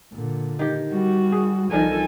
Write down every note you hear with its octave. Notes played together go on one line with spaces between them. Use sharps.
A#2 D3
D#3 G4
G3 F#4
G#4
C2 D#3 F3 D4 A4 A#4 G#5